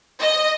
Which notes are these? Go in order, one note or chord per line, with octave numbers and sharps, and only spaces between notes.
D#5